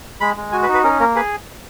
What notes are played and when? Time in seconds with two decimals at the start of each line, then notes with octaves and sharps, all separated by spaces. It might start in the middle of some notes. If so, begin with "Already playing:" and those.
0.21 G#3 B5
0.36 G#3
0.52 F#4 G#5
0.63 B4
0.68 D#4
0.74 B4
0.84 C#4 A#4
1.00 A#3 A#4
1.15 G#4 B4